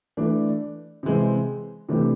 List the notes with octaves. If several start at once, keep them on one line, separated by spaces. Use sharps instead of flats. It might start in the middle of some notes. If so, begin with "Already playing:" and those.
E3 A3 D4
C3 E3 G#3 C4
C3 E3 A3 D4 G4